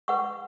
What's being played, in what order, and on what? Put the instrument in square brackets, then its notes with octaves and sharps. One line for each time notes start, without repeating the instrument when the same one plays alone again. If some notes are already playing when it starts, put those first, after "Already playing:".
[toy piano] B4 F#5 C#6